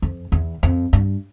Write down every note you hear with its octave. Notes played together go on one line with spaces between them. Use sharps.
F2
E2
F2
G2